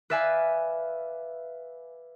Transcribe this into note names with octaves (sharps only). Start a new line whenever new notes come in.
B4 D5 E5 F5 G#5